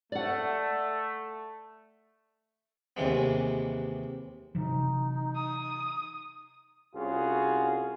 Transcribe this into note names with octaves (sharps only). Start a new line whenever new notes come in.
A3 D5 F#5
D#2 C3 E3 G#3 B3
C3 E3 F#3 D#4
D#6
C2 C#4 F4 F#4 G#4